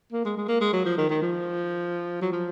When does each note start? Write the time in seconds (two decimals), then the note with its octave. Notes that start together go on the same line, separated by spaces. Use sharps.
0.12 A#3
0.25 G#3
0.37 G#3
0.49 A#3
0.61 G#3
0.73 F#3
0.86 F3
0.98 D#3
1.10 D#3
1.22 F3
2.22 F#3
2.32 F3